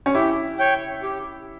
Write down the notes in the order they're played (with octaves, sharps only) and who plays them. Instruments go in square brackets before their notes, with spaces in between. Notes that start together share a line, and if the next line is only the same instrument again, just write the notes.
[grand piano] C#4
[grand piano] E4 [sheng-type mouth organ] G4
[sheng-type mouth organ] C#5 G5
G4